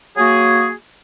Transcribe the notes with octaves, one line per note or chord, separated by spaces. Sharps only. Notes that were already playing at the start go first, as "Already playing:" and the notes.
F#3 A#3 F#4 G#4